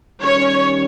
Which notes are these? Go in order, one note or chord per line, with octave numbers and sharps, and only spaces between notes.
D#3 G3 C#4 C#5